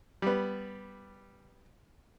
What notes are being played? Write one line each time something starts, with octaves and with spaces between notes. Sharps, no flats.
G3 B3